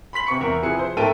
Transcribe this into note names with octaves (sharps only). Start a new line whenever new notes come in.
B5 C6 B6 F#7
C3 C4 C#6 C#7
E2 A#4 E5
C3 F3 E4 G#4 B4 C#7
C5
G#2 A3 A4 A#4 G5 D#7